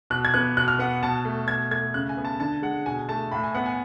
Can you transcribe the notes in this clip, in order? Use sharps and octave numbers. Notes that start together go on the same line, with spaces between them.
B2 F#6
G#6
B3 F#6
B2 F#6
F6
B3 F#5
B2 A5
A3
B2 G#6
A3 G#6
C#3 F#6
G#5
B3
A5
D3 A5
G#3 F#5
B2 G#5
A3 A5
A2 B5
G#5
B3 F#5
G#5